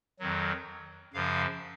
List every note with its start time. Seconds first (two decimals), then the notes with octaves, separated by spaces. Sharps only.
0.19 F2 D#3 F#3
1.14 F#2 C#3 F3 F5